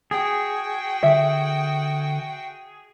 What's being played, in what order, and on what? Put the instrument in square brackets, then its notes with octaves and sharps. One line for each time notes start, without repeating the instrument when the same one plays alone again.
[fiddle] F#4 G5 [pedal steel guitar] G#4
[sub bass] D3 [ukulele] E5